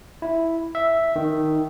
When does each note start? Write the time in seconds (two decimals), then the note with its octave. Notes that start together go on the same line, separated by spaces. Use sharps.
0.22 E4
0.75 E5
1.16 D#3